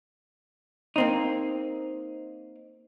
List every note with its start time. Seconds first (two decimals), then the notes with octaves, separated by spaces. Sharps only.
0.96 A#3 C4 D#4